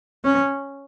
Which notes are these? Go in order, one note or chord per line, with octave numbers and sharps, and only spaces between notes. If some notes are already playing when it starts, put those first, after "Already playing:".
C#4